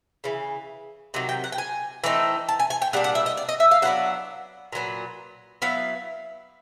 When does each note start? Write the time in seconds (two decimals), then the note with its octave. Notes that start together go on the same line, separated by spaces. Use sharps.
0.24 C#3 E3
1.14 C3 D#3 F#3
1.29 G5
1.44 F#5
1.52 G5
1.58 G#5
2.04 E3 A3 C4 D#4
2.49 A5
2.60 G#5
2.70 G#5
2.82 G5
2.93 A#2 G3 D4 F#5
3.04 F#5
3.15 E5
3.26 D#5
3.37 D5
3.49 D#5
3.60 E5
3.71 F5
3.82 F#3 B3 D4 F#5
4.73 A#2 F#3 B3
5.62 F#3 B3 E4 F5